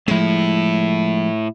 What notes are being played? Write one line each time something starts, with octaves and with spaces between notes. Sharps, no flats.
A2 F3 G#3 E4